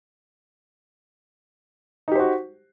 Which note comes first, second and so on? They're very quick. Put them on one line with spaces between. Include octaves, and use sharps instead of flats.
D#4 G4 C5 F#4